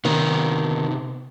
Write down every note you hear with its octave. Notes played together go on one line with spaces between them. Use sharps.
C3 D#3 B3 A#5